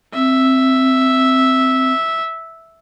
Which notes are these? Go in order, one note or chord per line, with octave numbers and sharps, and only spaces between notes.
C4 E5